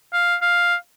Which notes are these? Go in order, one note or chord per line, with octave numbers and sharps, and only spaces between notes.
F5
F5